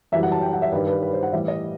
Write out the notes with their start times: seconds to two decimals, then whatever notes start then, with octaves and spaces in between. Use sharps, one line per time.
0.12 F#2 E3 G3 E5
0.23 F#5
0.32 A5
0.42 G5
0.53 F#5
0.62 E5
0.72 G2 D#3 G3 B4
0.87 B4
1.02 B4
1.13 C5
1.23 F#5
1.33 A2 E3 G3 E5
1.48 D#5